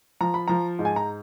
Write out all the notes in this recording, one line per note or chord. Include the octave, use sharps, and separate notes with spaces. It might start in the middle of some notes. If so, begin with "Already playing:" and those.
F3 A#5
B5
F3 A#5
G#2
G#5
A#5